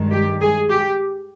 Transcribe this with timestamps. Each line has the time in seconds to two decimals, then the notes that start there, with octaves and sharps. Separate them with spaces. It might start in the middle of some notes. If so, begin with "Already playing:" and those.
Already playing: G2 D#3 G#3
0.11 G4
0.40 G#4
0.69 G4